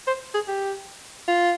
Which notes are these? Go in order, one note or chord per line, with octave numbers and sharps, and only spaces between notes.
C5
G#4
G4
F4